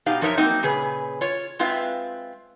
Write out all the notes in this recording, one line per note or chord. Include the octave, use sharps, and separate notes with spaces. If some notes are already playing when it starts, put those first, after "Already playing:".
B2 D#4 G4 F5
F#2 F3 D#4 A#4 C#5 E5
F#3 A#3 C4 D#4
A#2 C#3 G#4 B4
F4 C#5
G#3 C4 F4 B4 E5 F5